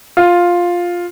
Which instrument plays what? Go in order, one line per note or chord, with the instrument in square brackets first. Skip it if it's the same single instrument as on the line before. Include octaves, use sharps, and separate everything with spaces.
[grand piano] F4